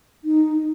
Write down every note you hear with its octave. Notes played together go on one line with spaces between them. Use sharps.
D#4